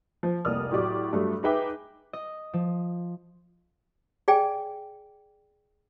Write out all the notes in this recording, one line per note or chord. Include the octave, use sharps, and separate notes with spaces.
F3
F1 C2 A#3 D5 D#6 F6
A2 F#3 G4 D5 D6
G2 F#3 A3 D4
D#4 G#4 B4 E5 G5 D6
D#5
F3
G#4 D5 G5 G#5